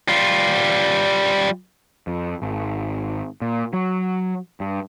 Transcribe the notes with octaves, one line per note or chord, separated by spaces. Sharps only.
G3 F4
F2
G#1
A#2
F#3
G2